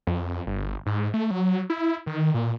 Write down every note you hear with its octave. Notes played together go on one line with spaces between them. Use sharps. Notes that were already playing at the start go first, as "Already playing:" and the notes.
F2
G1
G#2
A3
F#3
E4
D#3
A#2